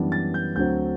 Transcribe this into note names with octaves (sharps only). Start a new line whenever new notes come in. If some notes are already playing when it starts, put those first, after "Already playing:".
Already playing: F#2 E3 G3 B3 D4
A6
G6
D2 D3 F#3 C4 G6